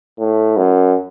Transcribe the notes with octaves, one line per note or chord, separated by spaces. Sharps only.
A2
F#2